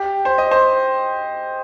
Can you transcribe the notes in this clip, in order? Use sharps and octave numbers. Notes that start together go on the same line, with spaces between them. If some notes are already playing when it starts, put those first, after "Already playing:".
Already playing: G4
C5
D#5
C5